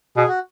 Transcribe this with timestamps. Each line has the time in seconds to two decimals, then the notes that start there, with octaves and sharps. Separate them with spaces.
0.17 B2 G#4
0.28 F#4